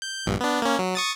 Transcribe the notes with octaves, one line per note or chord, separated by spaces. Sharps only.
G6
A#1 G2
B3 D4
A#3 C#4
F#3
C#6 D#6 A6